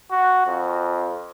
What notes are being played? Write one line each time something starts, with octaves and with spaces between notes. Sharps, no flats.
F#4
F2